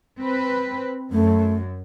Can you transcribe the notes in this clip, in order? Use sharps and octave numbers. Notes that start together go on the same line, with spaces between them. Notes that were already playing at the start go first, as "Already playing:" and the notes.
C4 B4
F#2 A3